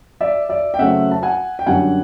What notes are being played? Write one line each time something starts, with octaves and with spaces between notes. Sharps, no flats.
D5 E5
D5 E5
G5
C#3 F#3 A3 C4 E5 F#5
A5
F#5 G#5
G5
F#2 D3 G3 F#5 G#5